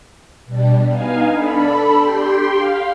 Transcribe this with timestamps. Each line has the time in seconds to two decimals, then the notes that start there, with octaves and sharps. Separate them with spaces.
0.46 B2 G3 D4
0.88 B3 D#4 F5 G#5
1.31 D4 A4 B5
1.95 G4 G5 C6
2.53 F5